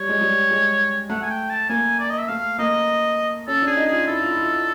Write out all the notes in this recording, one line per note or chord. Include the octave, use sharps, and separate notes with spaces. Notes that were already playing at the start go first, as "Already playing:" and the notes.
Already playing: G3 C#5
G#3
G3
G#3
A3 F#5
G#5
G5
A5
A#3 G#5
D5
D#5
E5
A3 F5
A#3 D#5
C#4 A4
D4 G#4
D#4
G#4
F4
E4 A4
F4
E4
F4
F4